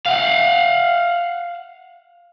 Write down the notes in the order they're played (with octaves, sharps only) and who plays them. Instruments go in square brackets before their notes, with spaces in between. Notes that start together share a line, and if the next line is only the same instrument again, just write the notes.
[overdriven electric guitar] F5 F#5